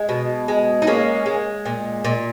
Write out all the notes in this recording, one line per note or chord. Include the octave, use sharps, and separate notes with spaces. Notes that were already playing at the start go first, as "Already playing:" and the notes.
Already playing: G#3
B2
G#3
D#4
G#3 A#3 C#4
G#3
A#2
A#2